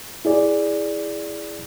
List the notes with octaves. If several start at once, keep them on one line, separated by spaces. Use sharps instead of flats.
E4 G#4 D5